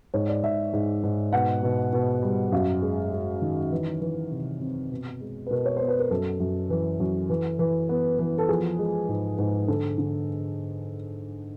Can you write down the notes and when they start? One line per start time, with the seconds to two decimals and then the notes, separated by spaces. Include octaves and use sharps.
0.14 G#2 C#5
0.29 D5
0.43 G#2 E5
0.73 G#2
1.04 G#2
1.33 B2 F#5
1.63 B2
1.93 B2
2.23 G3
2.52 F#2 F5
2.82 G#3
3.12 G#3
3.42 D#3
3.72 E3
4.02 E3
4.31 C3
4.61 C4
4.91 B2
5.21 G#3
5.46 B4
5.51 B2 A#4
5.66 C#5
5.77 B3 C5
5.88 B4
5.99 A#4
6.10 F#2 A4
6.40 F#2
6.70 E3
7.00 F#2
7.29 E3
7.59 E3
7.89 B3
8.19 E3
8.38 A4
8.49 F3 G#4
8.79 G#3
9.09 G#2
9.39 G#2
9.68 D3 A4
9.98 D3